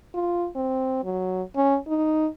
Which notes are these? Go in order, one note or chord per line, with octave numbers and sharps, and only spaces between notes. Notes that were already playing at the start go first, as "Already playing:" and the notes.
F4
C4
F#3
C#4
D#4